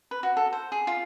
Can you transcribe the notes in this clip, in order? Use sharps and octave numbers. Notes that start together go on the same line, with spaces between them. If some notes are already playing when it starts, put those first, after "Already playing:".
B4
F#4
A4
C5
G#4
F4